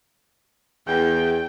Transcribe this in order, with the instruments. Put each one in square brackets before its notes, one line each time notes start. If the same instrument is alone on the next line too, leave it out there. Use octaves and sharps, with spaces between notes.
[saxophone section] E2 [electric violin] G5